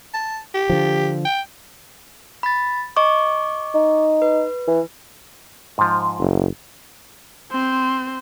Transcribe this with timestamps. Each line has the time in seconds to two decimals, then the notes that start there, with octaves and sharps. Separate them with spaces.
0.14 A5
0.55 G4
0.70 D3 F3
1.25 G5
2.43 B5 A6
2.97 D#5 C#6 D6
3.74 D#4
4.22 B4
4.68 E3
5.78 G#2 F3
6.19 F#1
7.52 C4 C5